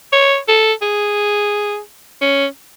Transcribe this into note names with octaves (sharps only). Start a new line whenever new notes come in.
C#5
A4
G#4
C#4